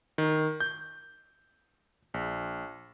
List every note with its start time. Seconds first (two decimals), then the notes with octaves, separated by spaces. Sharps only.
0.18 D#3
0.60 G6
2.14 A#1